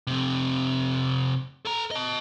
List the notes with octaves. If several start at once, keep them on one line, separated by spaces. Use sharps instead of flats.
F2 C3
A4 A#5
D#5 A5